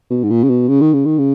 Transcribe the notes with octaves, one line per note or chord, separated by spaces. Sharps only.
B2
G#2
A#2
C#3
B2
C#3
D#3
C#3
D#3
C#3